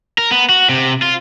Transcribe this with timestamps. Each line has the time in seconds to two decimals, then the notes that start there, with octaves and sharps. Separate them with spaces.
0.18 A#4
0.31 B3
0.49 F#4
0.69 C3
1.02 F4